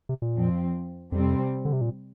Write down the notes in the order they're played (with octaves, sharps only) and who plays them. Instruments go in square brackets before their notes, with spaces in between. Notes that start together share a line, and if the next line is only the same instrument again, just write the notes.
[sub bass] C3
A#2
[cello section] F2 F3 C4
[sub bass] F2 [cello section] C3 G3 C4
[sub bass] D3
C3
A#2